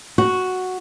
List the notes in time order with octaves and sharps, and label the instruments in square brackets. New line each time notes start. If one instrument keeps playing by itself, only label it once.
[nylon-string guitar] F#4